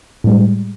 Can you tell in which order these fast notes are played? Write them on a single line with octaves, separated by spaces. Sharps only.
A2 G3 G#3